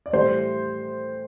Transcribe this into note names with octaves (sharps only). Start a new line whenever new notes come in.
D5
A2 E3 G3 C5